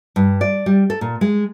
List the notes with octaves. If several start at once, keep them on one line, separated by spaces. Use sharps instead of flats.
G2
D5
G3
A4
A#2
G#3